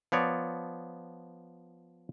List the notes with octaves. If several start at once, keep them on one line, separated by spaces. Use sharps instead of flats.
F3 B3 C#5 D5